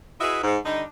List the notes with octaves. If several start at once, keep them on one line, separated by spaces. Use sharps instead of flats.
E4 F#4 G#4 B4 D#5 E5
G#2
D3 G3 D4 D#4